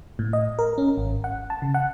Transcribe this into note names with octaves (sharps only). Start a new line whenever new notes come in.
A2
D#5
A#4
C#4
G#1
F#5
A5
C#3
F#5